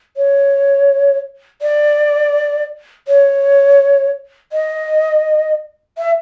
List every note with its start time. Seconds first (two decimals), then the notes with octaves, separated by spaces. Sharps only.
0.17 C#5
1.62 D5
3.08 C#5
4.52 D#5
5.98 E5